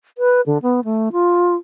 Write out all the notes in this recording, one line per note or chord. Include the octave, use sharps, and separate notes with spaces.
B4
D3
B3
A3
F4